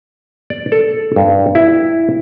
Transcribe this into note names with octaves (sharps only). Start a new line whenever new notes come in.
D5
A4
G2
E4